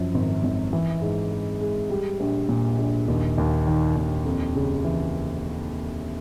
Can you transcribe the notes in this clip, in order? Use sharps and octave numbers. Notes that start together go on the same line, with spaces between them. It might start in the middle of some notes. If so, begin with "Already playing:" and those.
Already playing: F#2 F3
G#1
G#1
E3
G#2
G#3
G#3
G3
A#1
A#2
A#1
D#2
D#2
D#3
D#2
F2
C#3
E3